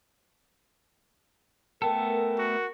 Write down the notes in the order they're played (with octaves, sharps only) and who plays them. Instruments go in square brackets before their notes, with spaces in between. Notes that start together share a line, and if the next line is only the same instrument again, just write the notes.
[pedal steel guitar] A3 B3 A4 [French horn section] A#4 [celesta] G5 A5
[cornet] F#4